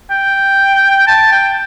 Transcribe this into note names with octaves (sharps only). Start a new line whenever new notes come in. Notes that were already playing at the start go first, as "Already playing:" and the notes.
G5
A5
G5